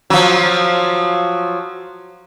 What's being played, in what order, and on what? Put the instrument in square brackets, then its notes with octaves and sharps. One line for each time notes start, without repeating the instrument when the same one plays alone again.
[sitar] F3 F#3